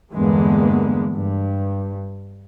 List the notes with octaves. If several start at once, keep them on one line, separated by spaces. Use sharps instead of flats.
E2 G2 D3 G#3 A#3 B3
G2